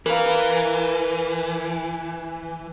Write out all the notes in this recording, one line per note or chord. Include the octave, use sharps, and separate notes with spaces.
E3 A#4 B4 F5